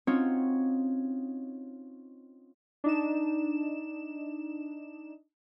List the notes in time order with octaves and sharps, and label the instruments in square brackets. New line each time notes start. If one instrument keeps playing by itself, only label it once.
[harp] C4 C#4 D#4 F4 F#4 C#5
[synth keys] D4 D#4 E7